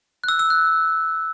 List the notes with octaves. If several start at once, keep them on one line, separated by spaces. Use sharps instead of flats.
F#6
E6
E6
F#6